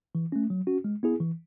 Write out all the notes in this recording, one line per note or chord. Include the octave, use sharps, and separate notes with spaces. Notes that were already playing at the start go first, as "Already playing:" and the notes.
E3
A3 C#4
F#3
C#4 F#4
G#3
B3 E4 G#4
E3